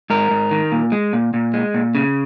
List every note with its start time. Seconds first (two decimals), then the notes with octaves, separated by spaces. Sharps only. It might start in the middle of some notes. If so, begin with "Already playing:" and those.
0.10 G#2 A#4
0.31 G#2
0.51 D#3
0.72 A#2
0.92 G#3
1.13 A#2
1.34 A#2
1.53 G#3
1.74 A#2
1.95 C#3